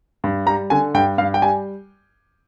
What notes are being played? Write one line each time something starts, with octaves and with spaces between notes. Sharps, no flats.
G2
G3 A#5
D3 G#5
G2 G5
G2 F5
G5
G3 G#5